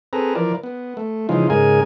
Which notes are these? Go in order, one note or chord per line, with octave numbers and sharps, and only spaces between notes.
C4 G#4 A4 B4 A#5
E3 F3 A#4 D5
B3
A3
C#3 E3 F3 G#3 D#4 F4
G#2 C#3 G#3 G#4 A#4 G#5